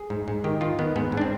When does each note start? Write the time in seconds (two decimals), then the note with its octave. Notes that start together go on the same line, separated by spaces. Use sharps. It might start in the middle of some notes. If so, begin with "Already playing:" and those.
Already playing: G#4
0.10 G#2
0.28 G#2
0.44 D#3 G4
0.61 D#3 F4
0.79 D#3 B3
0.96 G#2 B3
1.12 G#2
1.17 D4
1.21 C4